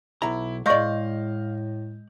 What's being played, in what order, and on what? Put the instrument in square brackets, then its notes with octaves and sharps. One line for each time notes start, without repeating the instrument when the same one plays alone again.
[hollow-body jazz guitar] B1 A#5 [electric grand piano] E4
[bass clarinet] A2 [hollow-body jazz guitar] G#3 D5 [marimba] D#5 C#6 [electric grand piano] F5 G6 A#6